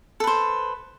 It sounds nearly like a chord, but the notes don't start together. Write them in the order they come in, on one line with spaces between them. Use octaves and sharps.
A4 B4 C5